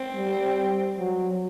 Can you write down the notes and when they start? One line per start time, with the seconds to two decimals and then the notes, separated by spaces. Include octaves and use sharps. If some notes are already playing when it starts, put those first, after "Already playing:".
Already playing: C4
0.15 G3
0.98 F#3